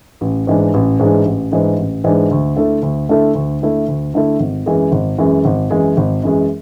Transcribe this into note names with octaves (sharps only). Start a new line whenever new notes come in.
A1
G#2 E3 G#3 D4
A1
G#2 E3 G#3 D4
A1
G#2 E3 G#3 D4
A1
G#2 E3 G#3 D4
D2
D3 A3 E4 A4
D2
D3 A3 E4 A4
D2
D3 A3 E4 A4
D2
D3 A3 E4 A4
G#1
F#2 E3 G#3
G#1
F#2 E3 G#3
G#1
F#2 E3 G#3
G#1
F#2 E3 G#3